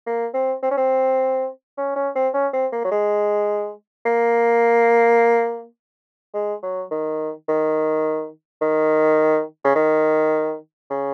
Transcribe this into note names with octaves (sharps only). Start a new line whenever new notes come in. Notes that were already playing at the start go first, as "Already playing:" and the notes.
A#3
C4
C4
C#4
C4
C#4
C#4
C4
C#4
C4
A#3
F#3
G#3
A#3
G#3
F#3
D#3
D#3
D#3
C#3
D#3
C#3